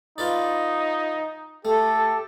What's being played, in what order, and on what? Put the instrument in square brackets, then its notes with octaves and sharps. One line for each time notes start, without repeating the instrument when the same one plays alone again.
[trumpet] D#4 [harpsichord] F4 B4 D5
[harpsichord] A3 [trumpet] G4 [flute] A4